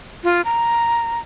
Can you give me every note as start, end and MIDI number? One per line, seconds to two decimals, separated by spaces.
0.24 0.41 65
0.45 1.20 82